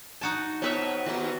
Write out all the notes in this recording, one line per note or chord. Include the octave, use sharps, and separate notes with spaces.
D#4 F#4 G#5 A5
B2 B3 C4 B4 C#5 E5
D#2 B3 C4 D#4 F#4